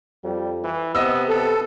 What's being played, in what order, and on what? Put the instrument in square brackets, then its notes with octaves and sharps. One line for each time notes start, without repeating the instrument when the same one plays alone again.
[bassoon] F2 [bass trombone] G3
[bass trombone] E3
[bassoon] C3 [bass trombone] B3 [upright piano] D#5 E6
[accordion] A4